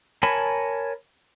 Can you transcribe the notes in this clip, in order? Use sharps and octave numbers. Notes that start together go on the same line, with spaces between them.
A#4 C#5 G#5 A5 B5